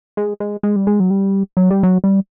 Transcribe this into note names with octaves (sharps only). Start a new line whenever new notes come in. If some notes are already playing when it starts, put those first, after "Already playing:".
G#3
G#3
G#3
G3
G#3
F#3
G3
F#3
G3
F#3
G3